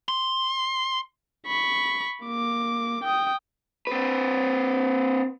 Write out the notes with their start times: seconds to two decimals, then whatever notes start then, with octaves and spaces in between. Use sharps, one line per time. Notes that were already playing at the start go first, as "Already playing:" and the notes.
0.08 C6
1.47 B5 C#6
2.25 A#3 D6
3.03 G5 D#6
3.87 C4 B4